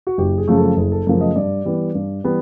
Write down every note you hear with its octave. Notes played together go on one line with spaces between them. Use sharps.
F#4
F#1 G4
G#4
F#2 C#3 F3 A3
A4
F#1 G#4
A4
F#2 C#3 F3 A3 A#4
D#5
G2 D5
E3 G3 B3
G2
E3 G3 B3